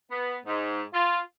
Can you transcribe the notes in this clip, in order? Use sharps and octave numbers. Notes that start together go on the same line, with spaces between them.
B3
G#2
F4